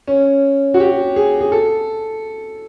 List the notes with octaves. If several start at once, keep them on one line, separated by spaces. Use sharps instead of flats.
C#4
F#4
G4
G#4
G#4
A4